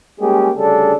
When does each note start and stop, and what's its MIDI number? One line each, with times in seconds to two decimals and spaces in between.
0.20 0.50 55
0.20 0.50 56
0.20 0.50 58
0.20 0.50 61
0.20 0.50 67
0.20 0.50 68
0.56 0.93 38
0.56 0.93 49
0.56 0.93 55
0.56 0.93 62
0.56 0.93 68
0.56 0.93 69